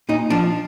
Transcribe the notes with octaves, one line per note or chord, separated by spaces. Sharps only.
A#2 D#4
F3 D4